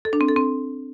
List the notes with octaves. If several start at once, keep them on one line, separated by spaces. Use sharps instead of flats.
A4
D4
C4
A4
C4